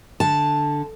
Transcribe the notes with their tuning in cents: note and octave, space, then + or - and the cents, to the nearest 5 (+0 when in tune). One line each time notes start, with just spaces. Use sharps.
D3 +0 A5 +0